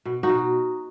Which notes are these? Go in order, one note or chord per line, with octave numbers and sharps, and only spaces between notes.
B2
D#4 F#4
B2